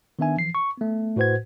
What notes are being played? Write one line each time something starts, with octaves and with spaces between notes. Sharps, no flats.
D#3 B3 D4 E5 G#5
E3 F3 C7
C#6
A3 B3
A2 F#4 B4 C5 F#5 G#6